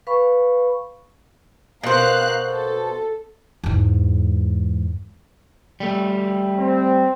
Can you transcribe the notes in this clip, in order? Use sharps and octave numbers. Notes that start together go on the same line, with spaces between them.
B4 F5 B5 C#6
B2 A#4 C5 F5 F#6
A4
E2 G#2
G3 A3
C4